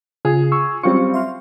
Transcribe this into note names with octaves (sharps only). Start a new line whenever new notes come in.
C#3 F4 G#4
C#6 E6
F#3 G3 C4 C#4 F4 C#6 C#7
E5 C6 F6